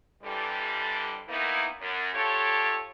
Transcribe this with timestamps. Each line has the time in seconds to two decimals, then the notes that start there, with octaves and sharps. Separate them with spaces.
0.23 F2 D3 E3 G3
1.28 A#2 A#3 B3 D#4 E4
1.81 F#2
2.14 D4 F4 G4 A4 C#5